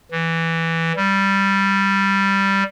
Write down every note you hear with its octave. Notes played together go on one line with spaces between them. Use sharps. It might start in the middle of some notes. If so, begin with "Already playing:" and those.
E3
G3